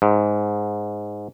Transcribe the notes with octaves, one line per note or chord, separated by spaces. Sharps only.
G#2